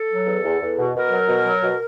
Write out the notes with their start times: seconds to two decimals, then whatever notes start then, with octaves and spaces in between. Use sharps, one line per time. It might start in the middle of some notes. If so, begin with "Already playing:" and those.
Already playing: A4
0.09 F#3
0.26 E2
0.44 E2
0.60 E2
0.78 B2
0.95 B2 A#4
1.11 F#3
1.29 B2
1.45 F#3
1.62 B2